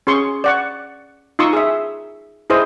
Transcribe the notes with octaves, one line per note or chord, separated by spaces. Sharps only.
C#4 G#4 C6 C#6
D5 F#5 C#6
D#4 F4 C6 C#6 D#6 E6
G#4 E5
E4 G#4 C5 D#5